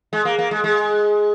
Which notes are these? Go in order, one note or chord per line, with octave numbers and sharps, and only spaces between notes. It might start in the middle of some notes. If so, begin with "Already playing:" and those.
G#3
A#3
A#3
G#3
G#3